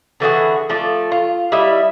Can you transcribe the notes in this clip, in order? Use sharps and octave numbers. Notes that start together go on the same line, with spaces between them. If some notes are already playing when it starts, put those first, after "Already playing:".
D3 E3 F#4 G#4
F3 A3 D5
F4
G3 E4 D#5 E5